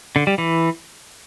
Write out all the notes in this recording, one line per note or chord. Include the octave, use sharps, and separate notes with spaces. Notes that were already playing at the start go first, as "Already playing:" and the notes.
D3
G3
E3